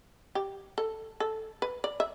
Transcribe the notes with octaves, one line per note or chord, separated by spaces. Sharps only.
G4
A4
A4
B4
D5
E5